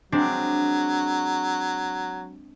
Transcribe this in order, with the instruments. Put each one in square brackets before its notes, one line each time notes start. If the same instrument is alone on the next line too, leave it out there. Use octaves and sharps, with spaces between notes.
[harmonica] F#3 [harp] G#3 C4 D4